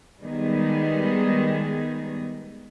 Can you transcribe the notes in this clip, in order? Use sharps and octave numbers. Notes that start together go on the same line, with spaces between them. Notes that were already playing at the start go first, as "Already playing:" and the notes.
D#3 G3 G#3 B3 D#4 G#4